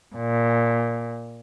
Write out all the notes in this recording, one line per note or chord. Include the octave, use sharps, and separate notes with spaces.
A#2